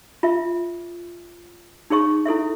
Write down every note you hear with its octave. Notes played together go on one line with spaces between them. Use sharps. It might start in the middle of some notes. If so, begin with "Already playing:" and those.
F4 E5
D#4 G#4 C#5 C#6
E4 A4 C#5 E5